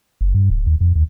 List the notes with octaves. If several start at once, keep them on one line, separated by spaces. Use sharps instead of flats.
F#1
G2
D1
D#2
F2
D#2